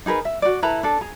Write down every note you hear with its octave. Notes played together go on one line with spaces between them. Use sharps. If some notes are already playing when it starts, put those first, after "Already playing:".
D#4 G#4 A#4 B4
E5
F#4 D5
E4 A4 B4 A#5
D4 A4
G#4 A#5